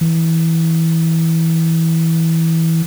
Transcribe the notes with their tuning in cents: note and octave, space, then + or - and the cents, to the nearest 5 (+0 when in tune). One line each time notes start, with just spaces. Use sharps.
E3 -15